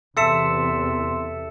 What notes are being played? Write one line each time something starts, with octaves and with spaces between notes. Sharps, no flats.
E2 C3 A4 E5 C6 E6 C#7 E7